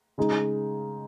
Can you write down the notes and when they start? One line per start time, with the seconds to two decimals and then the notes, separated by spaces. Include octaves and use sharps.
0.18 C#3 G#3 D#4